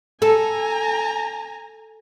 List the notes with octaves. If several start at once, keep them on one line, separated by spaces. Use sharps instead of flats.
A4 G#5 A#5